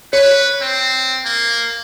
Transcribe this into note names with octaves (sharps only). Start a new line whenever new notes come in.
B4 C#5
C4
A#3